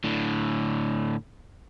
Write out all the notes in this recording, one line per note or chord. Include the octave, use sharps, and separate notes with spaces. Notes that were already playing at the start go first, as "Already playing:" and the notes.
A2 D3